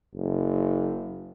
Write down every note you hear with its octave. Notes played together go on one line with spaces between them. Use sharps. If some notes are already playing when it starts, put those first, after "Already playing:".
F#1